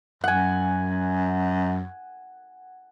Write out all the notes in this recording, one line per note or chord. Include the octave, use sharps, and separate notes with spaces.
F#2 F#5 G#5